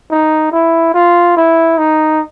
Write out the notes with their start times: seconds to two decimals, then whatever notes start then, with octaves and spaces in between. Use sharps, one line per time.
0.11 D#4
0.52 E4
0.94 F4
1.37 E4
1.78 D#4